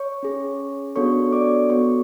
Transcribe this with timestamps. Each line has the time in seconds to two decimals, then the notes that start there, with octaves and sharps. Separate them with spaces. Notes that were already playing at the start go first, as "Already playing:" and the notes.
Already playing: C#5 C#6
0.23 C#4 G#4
0.96 B3 D4 F#4 A4 C#5 C#6
1.32 D5 D6
1.70 B3 F#4 A4 C#5 C#6